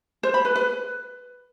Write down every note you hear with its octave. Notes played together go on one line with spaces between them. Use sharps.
C5
B5
B4
B4